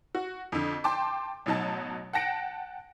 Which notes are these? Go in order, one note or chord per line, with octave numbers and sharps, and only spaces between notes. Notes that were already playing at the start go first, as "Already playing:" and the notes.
F#4
F2 D3
G5 A5 C6 D6
A1 B2 F#3 D#4 A5
F#5 G5 A5 A#6 C#7 D7